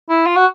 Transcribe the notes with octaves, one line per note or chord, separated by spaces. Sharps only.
E4
F4
F#4